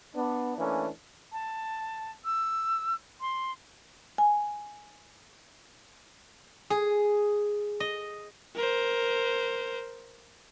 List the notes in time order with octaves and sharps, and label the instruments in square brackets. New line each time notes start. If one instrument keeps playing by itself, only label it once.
[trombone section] B3 D4
E3 A3 A#3 C#4 D4
[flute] A5
E6
C6
[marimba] G#5
[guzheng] G#4
D#5
[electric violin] A#4 C5